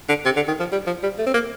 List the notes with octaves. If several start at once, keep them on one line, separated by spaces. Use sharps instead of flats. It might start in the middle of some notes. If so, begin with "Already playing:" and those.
D3
C3
D3
D#3
F3
G3
F3
G3
A3
C4
A#3